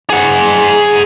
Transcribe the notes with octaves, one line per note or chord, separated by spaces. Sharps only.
G#4 F#5